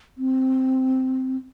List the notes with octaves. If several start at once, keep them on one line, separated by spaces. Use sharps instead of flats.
C4